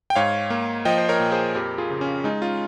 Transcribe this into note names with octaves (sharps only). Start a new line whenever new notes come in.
G5
G#2 C#5 F5
A#3
F3 D#5 G5
C5
A#4 C#5
A#2
G#4 C5
F2 G4 A#4
F4 G#4
C#3
C#4
G#3 D#4
C#4 F4